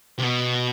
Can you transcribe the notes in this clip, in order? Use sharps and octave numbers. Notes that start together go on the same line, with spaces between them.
C3
B2